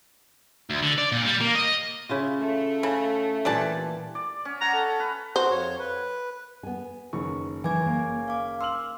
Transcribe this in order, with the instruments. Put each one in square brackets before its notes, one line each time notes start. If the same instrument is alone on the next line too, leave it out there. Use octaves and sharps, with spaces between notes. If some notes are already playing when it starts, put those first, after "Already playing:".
[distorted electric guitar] D2
D3
D5
A#2
G3
A#3
D#5
[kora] C#3 E4 F4
[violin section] A3
[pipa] C#3 [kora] E4
[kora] A#2 E3 G3 [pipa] D4 D5 A5
[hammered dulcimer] D5
C#4
[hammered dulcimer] F#5 [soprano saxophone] A#5
[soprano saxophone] A4
[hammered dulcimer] B4
[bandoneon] F#4 [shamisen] C5
[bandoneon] F2 C#5
B4
[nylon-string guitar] B3 G#5
[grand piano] F#1 D#3 C#6
[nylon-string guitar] E3 [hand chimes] G#5 D6 G#6
[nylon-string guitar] A#3
[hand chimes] F5 D6
[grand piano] C6 F6 F#7 [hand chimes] E6